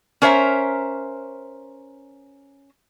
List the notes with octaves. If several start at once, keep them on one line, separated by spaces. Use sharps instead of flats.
C#4 A#4 C5 C#5 E5 A#5